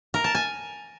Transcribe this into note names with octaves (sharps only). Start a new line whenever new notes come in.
A#4
A5
G#5